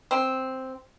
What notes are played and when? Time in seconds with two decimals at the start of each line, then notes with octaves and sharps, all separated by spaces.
0.11 C4